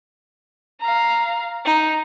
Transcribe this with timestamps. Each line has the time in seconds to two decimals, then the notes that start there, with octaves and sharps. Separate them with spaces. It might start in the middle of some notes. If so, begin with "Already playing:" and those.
0.81 F5 A#5
1.65 D#4